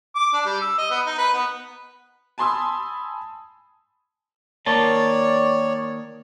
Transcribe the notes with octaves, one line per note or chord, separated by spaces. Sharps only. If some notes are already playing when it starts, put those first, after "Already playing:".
D6
D4
G3
E6
D#5
B3
D#4
B4
B3
G#5 A5 B5 C6 D#6 E6
D#3 A#3 C#5 D5 A5